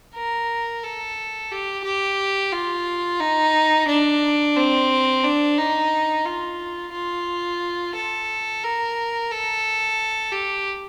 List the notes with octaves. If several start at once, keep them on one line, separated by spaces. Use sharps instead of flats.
A#4
A4
G4
G4
F4
D#4
D4
C4
D4
D#4
F4
F4
A4
A#4
A4
G4